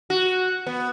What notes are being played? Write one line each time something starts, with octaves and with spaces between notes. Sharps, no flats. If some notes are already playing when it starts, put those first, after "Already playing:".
F#4
B3